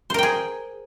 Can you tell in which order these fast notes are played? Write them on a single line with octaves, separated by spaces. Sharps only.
C5 A#4 G5 G#4